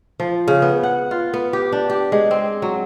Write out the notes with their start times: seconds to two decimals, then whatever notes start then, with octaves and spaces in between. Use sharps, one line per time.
0.20 F3
0.48 C#3
0.62 B3
0.83 F#5
1.11 F4
1.34 B3
1.53 G4
1.72 D4
1.90 G4
2.12 G#3
2.31 C4
2.62 F#3